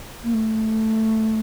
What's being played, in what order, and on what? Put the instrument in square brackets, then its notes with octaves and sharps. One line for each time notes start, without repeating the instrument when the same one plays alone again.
[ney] A#3
A3